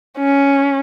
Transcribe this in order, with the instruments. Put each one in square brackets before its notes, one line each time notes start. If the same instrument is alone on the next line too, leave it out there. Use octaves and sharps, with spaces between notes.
[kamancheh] C#4